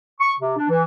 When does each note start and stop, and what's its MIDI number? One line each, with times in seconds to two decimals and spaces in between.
0.20 0.32 85
0.39 0.56 48
0.57 0.66 62
0.69 0.84 52